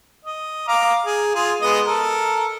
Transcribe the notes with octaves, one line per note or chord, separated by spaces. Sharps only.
D#5
F5 A#5 D6
G#4
F4 G#4
G#3 B3 D#5
A4 A#4